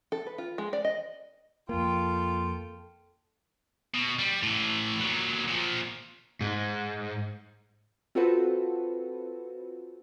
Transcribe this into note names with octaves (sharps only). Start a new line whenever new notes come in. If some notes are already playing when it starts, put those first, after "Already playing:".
A4
B4
F4
G#3
D5
D#5
F2 A#3 F4 A4 G5
B2
G3
A2 E3
A#2 F#3
A#2 F3
G#2
C4 F4 F#4 A4 B4